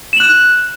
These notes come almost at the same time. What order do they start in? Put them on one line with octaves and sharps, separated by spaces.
E7 F#7 F#6